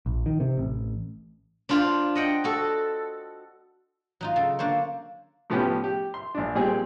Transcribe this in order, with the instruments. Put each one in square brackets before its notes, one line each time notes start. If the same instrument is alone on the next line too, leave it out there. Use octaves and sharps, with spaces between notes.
[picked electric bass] A#1
D#3
C3
A1
[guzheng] D4 F4 C5
D#5 F#5 G5
F#4 A4
F#3 D#4 F4
C#3 A4
D3 A#3 D4 C5 C#5
[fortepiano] A2 F3 B3 C#4 G4
G4
C6
A#1 D4
A#2 G3 C4 G#4